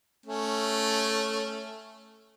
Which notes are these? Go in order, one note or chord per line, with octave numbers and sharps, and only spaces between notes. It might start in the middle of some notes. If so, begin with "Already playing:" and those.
A3 C#4